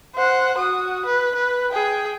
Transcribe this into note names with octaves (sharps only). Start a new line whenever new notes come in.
C5 F#5
F#4 D#6
B4
B4
G#4 G5